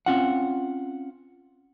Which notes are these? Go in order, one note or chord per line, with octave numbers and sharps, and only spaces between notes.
C4 C#4 F4 F5 F#5